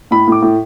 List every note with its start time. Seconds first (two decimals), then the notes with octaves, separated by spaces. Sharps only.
0.11 A2 B5
0.27 A2 D6
0.42 A2